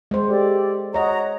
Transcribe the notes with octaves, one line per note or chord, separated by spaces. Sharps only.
G#3 C5
G4 A4 D5
F#4 C#5 D#5 F#5 A#5